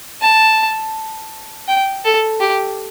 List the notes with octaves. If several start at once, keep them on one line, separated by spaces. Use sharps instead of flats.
A5
G5
A4
G4